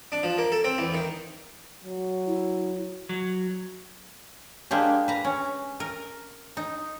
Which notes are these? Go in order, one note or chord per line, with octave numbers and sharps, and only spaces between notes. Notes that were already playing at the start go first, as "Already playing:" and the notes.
D4
F3
A#3
A4
C4
E2
D#3
F#3
E4
F#3
G#3 A#3 D4 G4
B4 A#5
C#4
A#4
D#4